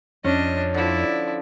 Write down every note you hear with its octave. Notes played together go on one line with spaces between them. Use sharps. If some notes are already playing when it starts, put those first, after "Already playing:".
F2 C#4 D4 D#5
D3 F3 E4 D5